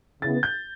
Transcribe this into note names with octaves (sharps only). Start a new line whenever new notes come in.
C#3 E3 B3 A6
G6